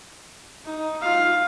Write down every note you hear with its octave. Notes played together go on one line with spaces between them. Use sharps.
D#4
F4 F5